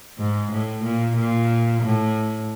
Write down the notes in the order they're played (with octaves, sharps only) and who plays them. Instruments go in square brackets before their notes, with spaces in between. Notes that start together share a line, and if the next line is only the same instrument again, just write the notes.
[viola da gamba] G#2
A2
A#2
A#2
A2